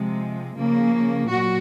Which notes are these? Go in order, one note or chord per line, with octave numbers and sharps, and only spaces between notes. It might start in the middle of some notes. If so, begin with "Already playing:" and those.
Already playing: C3 F3 G#3
C#3 F3 A#3
A#2 F#3 F#4